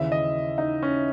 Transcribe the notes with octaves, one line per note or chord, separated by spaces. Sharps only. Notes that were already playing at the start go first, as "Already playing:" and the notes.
Already playing: D#2 C#3 E3 E5
D#5
D#4
C#4